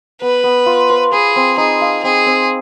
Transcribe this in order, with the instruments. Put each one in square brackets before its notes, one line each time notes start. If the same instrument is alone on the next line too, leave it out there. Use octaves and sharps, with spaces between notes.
[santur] B3 [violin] B4
[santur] B3
F4
C5
[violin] G#4 [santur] B4
[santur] C4
[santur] D#4 [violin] G#4
[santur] F5
[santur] C4 [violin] G#4
[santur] C4